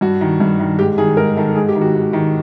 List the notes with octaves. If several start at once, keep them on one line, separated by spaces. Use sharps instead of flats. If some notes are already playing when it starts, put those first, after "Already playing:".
G2 F#4
D#3
G2
D#3
G#2 G4
D#3 G#4
G#2 A#4
D#3 A4
G#2 G#4
G4
D#3
F#4
G#2
D#3